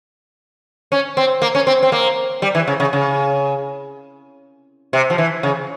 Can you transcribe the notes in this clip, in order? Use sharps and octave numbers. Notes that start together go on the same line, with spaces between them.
C#4
C4
A#3
C#4
C4
C4
A#3
G3
E3
C#3
C#3
C#3
C3
F3
E3
C#3